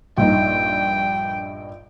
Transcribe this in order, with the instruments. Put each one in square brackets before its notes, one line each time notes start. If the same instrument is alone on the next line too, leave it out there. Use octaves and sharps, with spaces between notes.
[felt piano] A#1 G2 D#4 [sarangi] G5